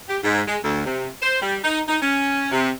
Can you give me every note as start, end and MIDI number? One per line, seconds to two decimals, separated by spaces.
0.09 0.17 67
0.23 0.41 44
0.47 0.57 56
0.63 0.85 38
0.86 1.08 48
1.22 1.37 72
1.41 1.57 55
1.64 1.81 63
1.88 1.97 63
2.02 2.50 61
2.51 2.70 48